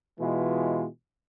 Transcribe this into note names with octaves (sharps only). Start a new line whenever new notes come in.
B2 E3 G#3 F4